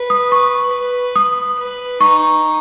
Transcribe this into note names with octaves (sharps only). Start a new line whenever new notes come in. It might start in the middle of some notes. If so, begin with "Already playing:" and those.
Already playing: B4
D#6
C#6
B4
D#6
B4
D#4 C#6